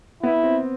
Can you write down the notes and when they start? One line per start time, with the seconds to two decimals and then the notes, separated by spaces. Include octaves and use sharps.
0.23 B3 E4
0.43 C4